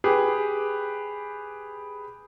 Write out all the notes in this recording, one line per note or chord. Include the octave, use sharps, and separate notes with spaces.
G4 G#4 B4